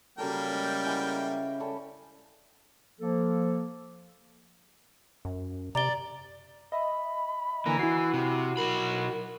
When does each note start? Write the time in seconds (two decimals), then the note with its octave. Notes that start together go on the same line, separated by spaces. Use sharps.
0.18 C#3 F#3 G3 A#3 A4 G5
0.52 G#3
0.85 E4 F#5 G#5
1.60 G3 C#4 A4
2.99 F3 A#3 A4
5.25 F#2
5.75 C3 D5 A#5 G7
6.72 D#5 E5 B5
7.66 D3 E3 A#3 A#5
7.79 E4 F#4 C7
8.14 C3
8.57 B1 A#4 B5